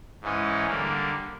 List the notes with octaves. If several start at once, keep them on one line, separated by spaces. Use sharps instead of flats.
G#2 E3 G#3 C#4
D3 G3 A#3